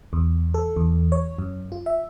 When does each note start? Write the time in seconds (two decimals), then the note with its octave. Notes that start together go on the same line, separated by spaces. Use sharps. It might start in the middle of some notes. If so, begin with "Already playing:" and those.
0.13 E2
0.54 A4
0.76 E2
1.12 C#5
1.38 F#2
1.72 F4
1.86 E5